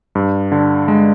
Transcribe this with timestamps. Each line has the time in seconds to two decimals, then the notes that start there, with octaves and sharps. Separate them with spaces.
0.15 G2
0.52 D3
0.88 G#3